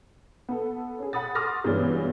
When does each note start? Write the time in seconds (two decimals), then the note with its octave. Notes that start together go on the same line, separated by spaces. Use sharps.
0.49 B3 A4
0.99 C#4 G#4
1.13 F#5 B5 D#6 A6
1.35 C6 D6 D#6 F6 A6 A#6
1.64 G2 B2 E3 G#3 C#4 D4